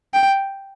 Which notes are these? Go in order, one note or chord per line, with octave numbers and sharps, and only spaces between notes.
G5